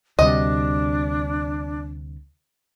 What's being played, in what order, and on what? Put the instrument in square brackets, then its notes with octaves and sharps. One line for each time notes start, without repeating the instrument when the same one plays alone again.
[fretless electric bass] D2 C3 G3 [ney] D4 [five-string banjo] D#5